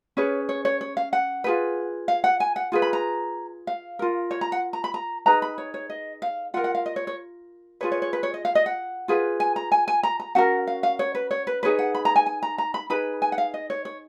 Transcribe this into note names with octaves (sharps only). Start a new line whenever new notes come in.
C#4 G#4 B4 C#5
C#5
C#5
C#5
F5
F#5
F4 G#4 B4
F5
F#5
G#5
F#5
F4 G#4 B4
B5
A#5
F5
F4 A#4
C#5
A#5
F#5
A#5
B5
A#5
D#4 G#4 B4 A#5
B5
C#5
C#5
D#5
F5
F4 A#4 F#5
F#5
F5
D#5
C#5
C#5
F4 G#4 B4 C#5
C#5
C#5
B4
C#5
D#5
F5
D#5
F#5
F4 G#4 B4
G#5
A#5
G#5
G#5
A#5
A#5
C#4 F#4 A#4 F#5
F5
F5
C#5
B4
C#5
B4
D#4 G#4 B4 C#5
F#5
B5
A#5
G#5
G#5
A#5
A#5
B5
D#4 G#4 B4 B5
G#5
F#5
F5
D#5
C#5
C#5